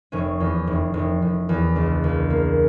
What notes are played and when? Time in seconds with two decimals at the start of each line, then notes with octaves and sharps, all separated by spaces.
0.12 F1 C#4
0.40 E2
0.67 F1
0.94 F1
1.22 F1
1.49 E2
1.76 C#2 D4
2.04 C#2
2.30 A#3